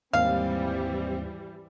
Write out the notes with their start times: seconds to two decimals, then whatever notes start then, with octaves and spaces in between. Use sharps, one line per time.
0.13 D#2 G#2 E3 G3 C4 F5